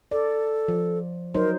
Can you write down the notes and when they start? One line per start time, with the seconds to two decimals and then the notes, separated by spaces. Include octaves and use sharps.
0.11 A4 D5
0.68 F3
1.34 F#3 D#4 A#4 C5